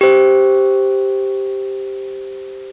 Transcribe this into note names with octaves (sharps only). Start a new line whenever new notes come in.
G4 C5